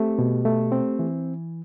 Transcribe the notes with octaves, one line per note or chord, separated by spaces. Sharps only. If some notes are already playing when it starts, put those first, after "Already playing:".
Already playing: A3 C4 G4
B2
A3
C4
E3